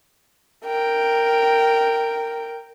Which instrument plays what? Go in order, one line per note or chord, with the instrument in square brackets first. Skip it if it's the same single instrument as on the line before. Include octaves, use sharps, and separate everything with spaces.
[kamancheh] A#4 G5